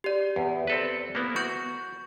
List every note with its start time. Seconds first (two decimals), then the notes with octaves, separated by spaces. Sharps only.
0.04 G4 D5
0.36 E2
0.67 C4 A4 B4
1.15 A#3 B3 E4
1.36 F#4 C#6 G6